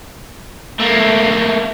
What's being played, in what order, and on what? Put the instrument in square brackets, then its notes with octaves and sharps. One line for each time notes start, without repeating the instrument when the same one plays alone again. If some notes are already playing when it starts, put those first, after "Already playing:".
[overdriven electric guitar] A3 A#3